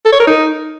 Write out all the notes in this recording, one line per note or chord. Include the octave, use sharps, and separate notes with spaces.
A4
C#5
A#4
D#4